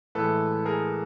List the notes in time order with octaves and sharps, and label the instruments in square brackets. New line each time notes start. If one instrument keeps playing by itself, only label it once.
[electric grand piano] A2 E3 G#3 A4 B4
G#4 A#4